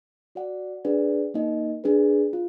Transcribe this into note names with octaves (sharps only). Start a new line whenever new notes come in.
F#4 D5 F#5
D4 G#4 B4 D5 F#5
A#3 D#4 A#4 D#5
D4 G#4 B4
F4